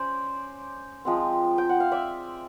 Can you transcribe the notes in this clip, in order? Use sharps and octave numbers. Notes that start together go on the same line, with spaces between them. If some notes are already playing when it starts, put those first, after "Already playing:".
Already playing: C#4 C5 D5
F3 G#3 C4
G5
F#5
F5
D5 E5